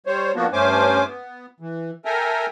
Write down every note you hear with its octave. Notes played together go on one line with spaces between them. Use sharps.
G3 C5 C#5
F3 A#3 B3 D4 F#4
G2 A3 C#4 C5 G#5 D6
B3
E3
A4 A#4 E5 G5 G#5 A#5